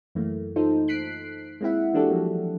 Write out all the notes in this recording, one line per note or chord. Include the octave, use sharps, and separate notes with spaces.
F#2 E3 A3 A#3
D#4 F4 A4 C5
F#6 B6 C7 D7
G#3 A#3 C4 E4 E5 F#5
E3 A#3 D4 F#4 G4 A4
F3 F#3 A#3